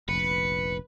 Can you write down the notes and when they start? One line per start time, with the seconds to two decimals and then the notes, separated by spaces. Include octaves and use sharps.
0.09 F1 A#1 B4 C#7